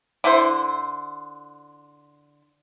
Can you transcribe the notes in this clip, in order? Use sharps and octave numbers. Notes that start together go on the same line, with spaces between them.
D3 E4 A4 C5